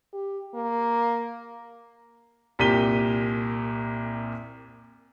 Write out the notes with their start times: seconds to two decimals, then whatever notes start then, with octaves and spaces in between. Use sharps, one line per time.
0.13 G4
0.54 A#3
2.59 C2 A#2 G4 B6 D#7 G7